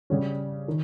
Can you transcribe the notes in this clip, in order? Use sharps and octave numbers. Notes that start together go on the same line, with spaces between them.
C#3 G3 C#4
D#3